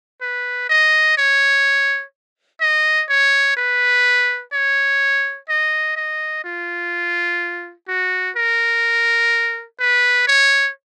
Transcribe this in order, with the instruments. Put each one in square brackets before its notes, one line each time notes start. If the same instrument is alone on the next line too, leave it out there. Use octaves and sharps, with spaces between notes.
[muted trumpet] B4
D#5
C#5
D#5
C#5
B4
C#5
D#5
D#5
F4
F#4
A#4
B4
C#5